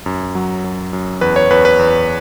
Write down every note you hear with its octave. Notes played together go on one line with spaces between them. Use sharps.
F#2
F#3
F#2
F#2
E2 B4
C#5
E2 B4
B4
E2